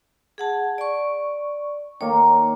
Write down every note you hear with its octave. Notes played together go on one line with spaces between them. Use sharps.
G#4 F#5 A5
D5 C#6
D#3 A#3 C#5